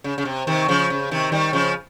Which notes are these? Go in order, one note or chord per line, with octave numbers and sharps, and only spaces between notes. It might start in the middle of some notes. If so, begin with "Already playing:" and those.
C#3
C#3
C3
C3 D#3
C#3 F3
C#3
C3 D#3
D#3 G3
C#3 F3